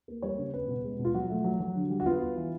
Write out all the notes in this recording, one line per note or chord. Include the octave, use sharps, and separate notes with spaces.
A#3
G3 C#5
C#3
B3 B4
B2
G#3
B2
F4
F#3 F#4
A3
F#3
F#3
D3
G3
F#4
B3 F4
B3
E3